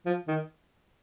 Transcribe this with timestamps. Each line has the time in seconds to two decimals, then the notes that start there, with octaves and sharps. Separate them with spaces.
0.06 F3
0.28 D#3